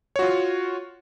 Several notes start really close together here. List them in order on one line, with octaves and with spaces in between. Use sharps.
C#5 F#4 F4